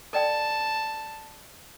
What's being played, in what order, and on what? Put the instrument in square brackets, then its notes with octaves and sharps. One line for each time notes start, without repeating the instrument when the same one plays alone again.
[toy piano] A4 D5 G5 [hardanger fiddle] A5